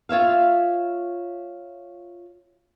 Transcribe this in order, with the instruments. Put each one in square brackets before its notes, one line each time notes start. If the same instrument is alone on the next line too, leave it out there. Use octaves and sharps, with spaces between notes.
[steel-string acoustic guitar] F4 C#5 E5 F5